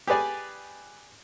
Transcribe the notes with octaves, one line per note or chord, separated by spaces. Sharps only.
G4 G#4 B4 D5 G#5